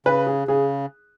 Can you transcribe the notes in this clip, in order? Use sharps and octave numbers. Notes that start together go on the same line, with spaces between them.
C#3 B4
G#4
C#3 G#4